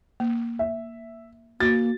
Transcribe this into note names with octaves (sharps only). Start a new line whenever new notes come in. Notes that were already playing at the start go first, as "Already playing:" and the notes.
A#3
E5
A#3 F#4 A6